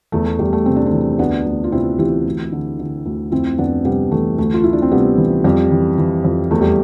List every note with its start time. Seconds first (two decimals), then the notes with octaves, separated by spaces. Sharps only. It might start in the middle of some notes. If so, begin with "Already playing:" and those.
0.12 E2 A3
0.26 A3
0.39 E2 G3
0.53 A3
0.66 C3 C4
0.76 D4
0.86 A3 C4
0.93 E3
1.19 D2 B3 D4
1.46 D2
1.64 F4
1.72 C3 C4 E4
1.99 E3 E4 G4
2.26 D2
2.52 D3
2.79 D3
3.06 D2
3.32 F2 C4 E4
3.58 F2 B3 D4
3.85 C3 G3 B3
4.12 E3 A3
4.38 D2 A3
4.54 F4
4.64 D2 E4
4.73 D4
4.82 C4
4.91 C3 G3 B3
5.18 E3
5.44 F2 G3
5.71 E3
5.98 E3
6.24 F2
6.51 E2 A3
6.61 G3